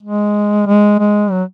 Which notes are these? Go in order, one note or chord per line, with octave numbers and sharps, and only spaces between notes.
G#3
G#3
G#3
F#3